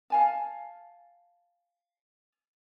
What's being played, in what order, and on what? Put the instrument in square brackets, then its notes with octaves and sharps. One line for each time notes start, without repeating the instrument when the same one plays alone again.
[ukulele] F5 G#5 A5